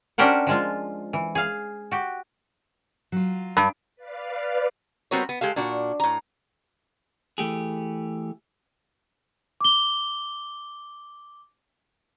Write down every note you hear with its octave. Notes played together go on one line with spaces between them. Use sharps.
C#4 D4 G4 A#4 C5 F#5
F3 G#3 F4
E3
G#4 F5
F#4 G4
F#3 F4
G2
B4 D5 F5
G3 B3 C4 F#4 A#4 C#5
B3
G#3 G4 A4 F5
A#2 D4 F#4
A2 A#5
E3 A3 G4 G#4
D6 G7